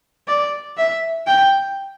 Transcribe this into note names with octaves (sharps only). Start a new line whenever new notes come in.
D5
E5
G5